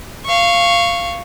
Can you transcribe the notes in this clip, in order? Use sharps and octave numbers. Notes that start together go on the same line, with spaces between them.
F5 C#6